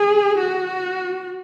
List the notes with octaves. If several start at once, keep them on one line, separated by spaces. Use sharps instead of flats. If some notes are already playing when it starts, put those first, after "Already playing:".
Already playing: G#4
F#4